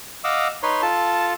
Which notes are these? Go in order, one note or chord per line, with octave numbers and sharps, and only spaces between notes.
D#5 F5 F#5 D6 E6
D#4 B4 C#5 C6
F4 A4 A5